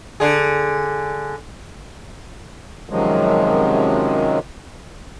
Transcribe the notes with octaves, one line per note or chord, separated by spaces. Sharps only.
D3 G#4
F#2 C3 D#3 F3 F#3 G#3